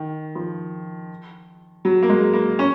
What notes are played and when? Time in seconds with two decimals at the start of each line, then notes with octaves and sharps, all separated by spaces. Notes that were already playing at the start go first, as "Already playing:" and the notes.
Already playing: D#3
0.35 F3
1.85 F#3
2.02 A#3
2.09 G#3
2.33 A#3
2.59 C#4